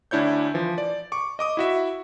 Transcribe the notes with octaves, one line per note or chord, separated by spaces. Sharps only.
D2 D4 E4 C#5 G6
E3 F3
D5
C#6 D6
D#5 D6 D#6
E4 F#4 E5